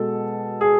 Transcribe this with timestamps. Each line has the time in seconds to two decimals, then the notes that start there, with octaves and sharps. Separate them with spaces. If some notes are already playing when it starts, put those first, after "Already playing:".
Already playing: B2 G#3 A4
0.61 G#4